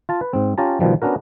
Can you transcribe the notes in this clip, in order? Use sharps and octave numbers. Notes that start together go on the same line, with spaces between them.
F4 A5
B4
G#2 C4
C#4 F4 G4 A5 A#5
B2 D#3 F3 G3
B3 C#4 D4 F#4 A#4